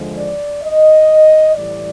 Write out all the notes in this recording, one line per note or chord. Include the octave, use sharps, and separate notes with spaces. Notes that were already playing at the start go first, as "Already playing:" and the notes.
Already playing: D#2 D3 F3 G#3
D5
D#5
A2 E3 G3 D5